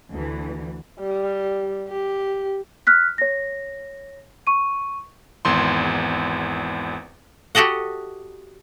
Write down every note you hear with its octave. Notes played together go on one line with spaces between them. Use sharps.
D2 E3
G3
G4
F6 F#6 B6
C#5 A#6
C#6 D#7
G#1 E2 C6
F#4 G4 A4 D#5 F#5